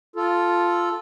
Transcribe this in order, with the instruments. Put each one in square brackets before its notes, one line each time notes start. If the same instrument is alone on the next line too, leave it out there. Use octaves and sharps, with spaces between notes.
[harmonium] F4 A4